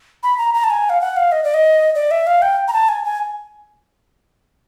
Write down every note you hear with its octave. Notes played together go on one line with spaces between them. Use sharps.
B5
A#5
A#5
A5
G#5
F5
F#5
F5
D#5
D5
D#5
D5
E5
F5
G5
A#5
A5
G#5
G#5